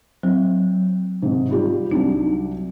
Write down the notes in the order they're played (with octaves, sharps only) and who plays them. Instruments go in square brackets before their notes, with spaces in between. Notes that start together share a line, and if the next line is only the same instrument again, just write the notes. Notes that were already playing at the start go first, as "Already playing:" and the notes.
[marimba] F#3 [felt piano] C4
[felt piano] G#2 C3
G3 F4 G4
[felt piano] C2 F#3 D4 [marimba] D#4